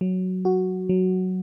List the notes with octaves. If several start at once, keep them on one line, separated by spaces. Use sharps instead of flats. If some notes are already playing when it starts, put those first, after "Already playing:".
F#3
F#4
F#3